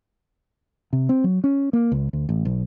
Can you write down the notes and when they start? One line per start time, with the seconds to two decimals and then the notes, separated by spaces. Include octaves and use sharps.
0.93 C3
1.09 C4
1.24 F#3
1.44 C#4
1.73 A#3
1.92 C#2
2.13 D2
2.29 A1
2.45 B1